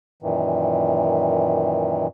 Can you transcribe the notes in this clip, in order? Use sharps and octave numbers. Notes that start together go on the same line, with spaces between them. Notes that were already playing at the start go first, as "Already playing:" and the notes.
F#2 A#2 D#3 E3